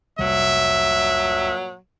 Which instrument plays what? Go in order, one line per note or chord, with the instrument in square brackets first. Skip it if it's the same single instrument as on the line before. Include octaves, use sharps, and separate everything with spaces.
[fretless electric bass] F1 C2 G3 [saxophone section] G2 A#2 F#3 [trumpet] E5